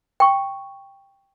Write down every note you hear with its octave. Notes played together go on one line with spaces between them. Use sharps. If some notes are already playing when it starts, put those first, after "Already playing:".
G5 C#6